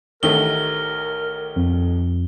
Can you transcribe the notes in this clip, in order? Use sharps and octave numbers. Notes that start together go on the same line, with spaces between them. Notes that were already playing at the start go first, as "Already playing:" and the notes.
A1 D#3 A3 A#4 G7
F2